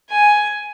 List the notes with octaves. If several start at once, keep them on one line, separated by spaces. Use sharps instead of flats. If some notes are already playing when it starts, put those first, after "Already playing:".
G#5